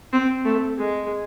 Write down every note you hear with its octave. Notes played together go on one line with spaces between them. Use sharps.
C4
A3
G#3